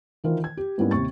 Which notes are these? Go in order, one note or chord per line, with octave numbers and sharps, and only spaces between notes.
D#3 E3 F4 A#4 C5
G#6
G4
G#2 G3 A#3 B3 C#4 E4
D#2 C3 C#6 A6